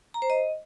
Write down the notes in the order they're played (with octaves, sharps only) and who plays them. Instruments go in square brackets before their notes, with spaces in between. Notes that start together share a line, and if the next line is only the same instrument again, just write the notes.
[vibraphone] A#5
C5
D#5